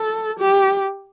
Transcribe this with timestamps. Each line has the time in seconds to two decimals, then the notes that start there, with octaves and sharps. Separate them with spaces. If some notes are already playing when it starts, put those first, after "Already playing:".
Already playing: A4
0.39 G4